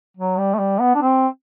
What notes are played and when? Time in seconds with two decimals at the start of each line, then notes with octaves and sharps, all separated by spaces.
0.17 F#3
0.38 G3
0.54 A3
0.59 G3
0.80 B3
0.94 D4
1.02 C4